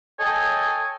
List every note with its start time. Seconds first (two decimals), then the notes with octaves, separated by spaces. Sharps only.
0.19 A4 C#5 D#5 G5 G#5